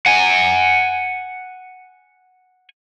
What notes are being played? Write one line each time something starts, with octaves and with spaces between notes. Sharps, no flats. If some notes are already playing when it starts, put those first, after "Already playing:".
F#5 G#5